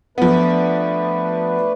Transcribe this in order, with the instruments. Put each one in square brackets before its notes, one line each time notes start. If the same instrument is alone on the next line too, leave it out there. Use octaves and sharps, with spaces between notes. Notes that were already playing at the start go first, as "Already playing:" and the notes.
[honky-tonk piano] F3 B3 [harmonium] A3 D4 B4